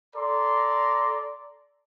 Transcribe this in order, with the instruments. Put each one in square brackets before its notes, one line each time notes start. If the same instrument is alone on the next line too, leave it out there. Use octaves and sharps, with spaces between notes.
[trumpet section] A4 D5 A#5 C6